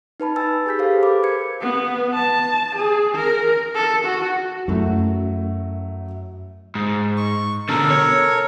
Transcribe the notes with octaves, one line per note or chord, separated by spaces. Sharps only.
D#4 B4 A5 B5
G#5 B5 E6 A6
G4 G#4 G6 B6
G4 A4 B4 C5 F5
C5 B5 D6
A#4 G#6 C#7
B3
A5
G#4
A#4
A4
F#4
F#2 F#3 A3 E4
G#2
C#6
B2 D3 A4 A#4
C#5